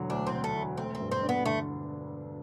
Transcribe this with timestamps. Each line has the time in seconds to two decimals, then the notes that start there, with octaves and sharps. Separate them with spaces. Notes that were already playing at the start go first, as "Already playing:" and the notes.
Already playing: E1 D3 F#3
0.10 D2 D4
0.27 C4
0.32 D3
0.44 A3
0.55 E1
0.77 A3 C4
0.95 C4
1.00 G2
1.11 C4
1.23 D4
1.29 B3
1.46 D3 A3